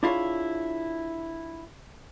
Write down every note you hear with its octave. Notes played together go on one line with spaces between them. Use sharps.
D4 E4 F4 G#4 C#5